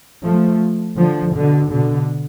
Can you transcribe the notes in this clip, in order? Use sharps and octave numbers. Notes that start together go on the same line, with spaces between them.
F3 A3
D3 F3
B2 D3
B2 D3